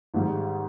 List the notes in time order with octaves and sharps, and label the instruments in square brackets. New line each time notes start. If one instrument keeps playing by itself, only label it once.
[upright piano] G#1 G#2 G3